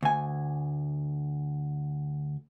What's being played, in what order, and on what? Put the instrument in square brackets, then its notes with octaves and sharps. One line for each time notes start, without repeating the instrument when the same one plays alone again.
[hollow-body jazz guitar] D2 G#5